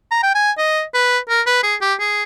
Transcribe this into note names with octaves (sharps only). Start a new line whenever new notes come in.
A#5
G5
G#5
D#5
B4
A#4
B4
G#4
G4
G#4